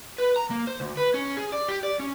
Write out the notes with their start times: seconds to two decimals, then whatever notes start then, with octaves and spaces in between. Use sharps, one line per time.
0.18 B4
0.36 A#5
0.50 A#3
0.67 C5
0.80 D2
0.97 B4
1.14 C#4
1.37 G#4
1.52 D5
1.68 G4
1.83 D5
1.99 C#4